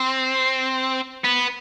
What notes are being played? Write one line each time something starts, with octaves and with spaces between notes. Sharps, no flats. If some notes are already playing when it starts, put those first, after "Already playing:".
Already playing: C4
B3